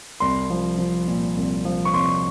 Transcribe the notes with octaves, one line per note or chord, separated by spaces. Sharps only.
C2 C6
F3
F3
A#2
C2
F3
C#6
C2 C6